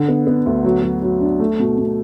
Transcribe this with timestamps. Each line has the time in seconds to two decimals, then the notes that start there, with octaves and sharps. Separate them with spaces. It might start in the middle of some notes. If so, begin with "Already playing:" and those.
Already playing: D3
0.08 B3
0.27 B3
0.46 D2
0.64 F#3
0.83 F#3
1.02 F#3
1.20 D4
1.40 A3
1.59 B2
1.78 B2